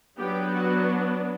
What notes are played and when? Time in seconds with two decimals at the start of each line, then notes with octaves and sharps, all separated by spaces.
0.17 F#3 B3 D4 G4
0.51 F#4